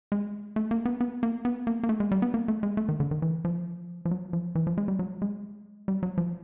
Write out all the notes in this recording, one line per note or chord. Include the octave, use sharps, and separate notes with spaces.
G#3
A3
A#3
B3
B3
A#3
B3
A#3
A#3
A3
G#3
G3
B3
A#3
A3
G#3
A3
D#3
D3
D#3
E3
F3
F3
F#3
F3
E3
F3
G#3
G3
F#3
G#3
G3
F#3
F3